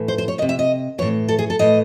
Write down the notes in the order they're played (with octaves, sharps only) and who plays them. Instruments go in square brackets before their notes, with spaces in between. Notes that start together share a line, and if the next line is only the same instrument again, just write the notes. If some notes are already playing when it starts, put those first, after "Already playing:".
Already playing: [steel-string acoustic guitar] A2 E3
C5
C5
C#5
D#3 D#5
C3
E5
D#5
A2 E3 C#5
A4
G#4
A4
A2 E3 D#5